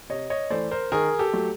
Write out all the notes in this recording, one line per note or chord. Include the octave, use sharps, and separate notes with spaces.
C3 C#5 D#5
C#5 D#5
E3 A3 C5 D5
A#4 C5
D#3 G#4 A#4
G4 A4
F#3 A3